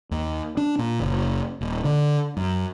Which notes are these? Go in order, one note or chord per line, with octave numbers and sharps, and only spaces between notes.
D#2
D4
A#2
F#1
D#1
D3
F#2